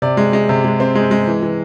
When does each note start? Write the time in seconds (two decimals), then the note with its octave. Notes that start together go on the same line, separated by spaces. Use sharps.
0.02 C3 D5
0.17 G#3
0.33 G#3
0.49 C3
0.64 G#3
0.80 C4
0.95 G#3
1.11 G#3
1.27 E3
1.42 E3